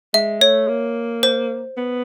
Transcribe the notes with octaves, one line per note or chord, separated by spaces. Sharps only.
G#3 E5
A3 C#5
A#3
C5
B3